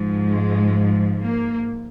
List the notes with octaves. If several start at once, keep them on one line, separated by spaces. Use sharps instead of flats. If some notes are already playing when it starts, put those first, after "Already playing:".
Already playing: G#2 F3
G#3
A#3